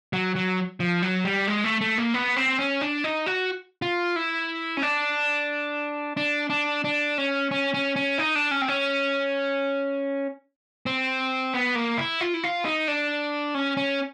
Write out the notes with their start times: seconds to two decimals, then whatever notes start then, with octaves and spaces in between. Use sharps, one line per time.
0.13 F#3
0.36 F#3
0.80 F3
1.03 F#3
1.25 G3
1.47 G#3
1.64 A3
1.81 A3
1.98 A#3
2.14 B3
2.36 C4
2.59 C#4
2.81 D4
3.04 D#4
3.26 F#4
3.82 F4
4.16 E4
4.77 C#4
4.82 D4
6.17 D4
6.50 D4
6.84 D4
7.18 C#4
7.51 C#4
7.74 C#4
7.96 C#4
8.18 D#4
8.35 D4
8.51 C#4
8.62 C4
8.68 C#4
10.86 C4
11.54 B3
11.75 A#3
11.98 E4
12.21 F4
12.34 E4
12.44 F4
12.65 D#4
12.88 D4
13.55 C#4
13.77 C#4